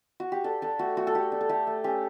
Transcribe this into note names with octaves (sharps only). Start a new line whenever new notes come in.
F#4
G4
D4 A4
D4 A4
A3 F#4
A3 F#4
A4
D4 G4
D4
A4
A3 G4
A3
C#4 G4